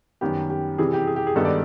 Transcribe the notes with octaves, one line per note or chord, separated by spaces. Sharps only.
F#2 D#3 G3 B3 G4
G4
C3 E3 G3 G#4
G4
G#4
G4
G#4
G2 D#3 G#3 B3 D#4 A4
D5